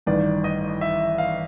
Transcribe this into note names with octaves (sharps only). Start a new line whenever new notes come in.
A1 G2 D#3 D5
D#5
E5
F5